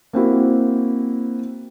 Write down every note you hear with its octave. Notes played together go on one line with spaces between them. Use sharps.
A#3 C4 E4 F#4